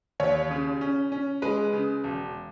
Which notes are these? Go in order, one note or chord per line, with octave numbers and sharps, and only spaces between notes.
D#2 C#5
C#3
C#4
C#4
G#3 B4
C#3
E1